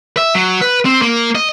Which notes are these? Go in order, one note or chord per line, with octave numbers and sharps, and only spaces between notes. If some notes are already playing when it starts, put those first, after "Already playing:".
E5
F#3
B4
C4
A#3
D#5